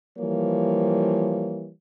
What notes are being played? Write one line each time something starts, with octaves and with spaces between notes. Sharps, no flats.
E3 F3 G3 A#3 C#5